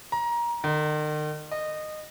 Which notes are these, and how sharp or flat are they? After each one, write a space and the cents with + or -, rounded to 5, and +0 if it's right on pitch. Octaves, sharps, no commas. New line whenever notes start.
A#5 +20
D#3 -40
D#5 -20